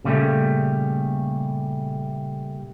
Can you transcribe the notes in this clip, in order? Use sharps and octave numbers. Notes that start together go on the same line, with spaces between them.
A#2 C#3 G3 A3